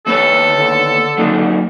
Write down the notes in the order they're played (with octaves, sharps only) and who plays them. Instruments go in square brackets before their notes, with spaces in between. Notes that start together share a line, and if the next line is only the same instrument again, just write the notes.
[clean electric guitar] D#2 B3 C#5 [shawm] A4
[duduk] D3
[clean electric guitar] F#3 A#3 D#4